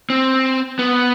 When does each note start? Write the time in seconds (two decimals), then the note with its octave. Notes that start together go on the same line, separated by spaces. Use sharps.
0.10 C4
0.79 B3